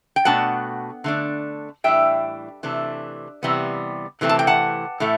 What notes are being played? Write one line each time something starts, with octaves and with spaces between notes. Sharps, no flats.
G5
B2 A3 D4 F#5 A5
D3 A3 D4
A2 E3 G3 D4 E5 G5
C3 E3 A3 D4
C3 E3 G3 B3
C3 E3 A3 C4
A5
G5
F#5 A5
A2 E3 A3